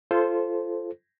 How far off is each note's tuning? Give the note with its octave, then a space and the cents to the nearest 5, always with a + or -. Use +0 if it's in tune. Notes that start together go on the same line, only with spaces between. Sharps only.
F4 -20 A4 -10 C5 +0